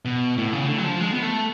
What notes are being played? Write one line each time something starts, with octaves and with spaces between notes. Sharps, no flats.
B2
A2
C#3
D3
F#3
F3
G#3
B3
A3